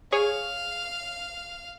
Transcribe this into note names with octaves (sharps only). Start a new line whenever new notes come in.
G#4 C#5 F5